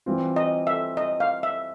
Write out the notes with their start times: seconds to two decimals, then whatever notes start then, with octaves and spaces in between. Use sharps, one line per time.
0.06 E3 G3 C4 F4
0.36 D#5
0.67 E5
0.97 D#5
1.20 F5
1.43 E5